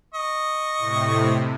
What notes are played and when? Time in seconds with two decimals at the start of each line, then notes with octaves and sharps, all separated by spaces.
0.14 D#5 C#6
0.78 A2 C3